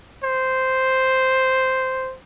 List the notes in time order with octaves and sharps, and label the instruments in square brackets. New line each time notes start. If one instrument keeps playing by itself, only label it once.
[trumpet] C5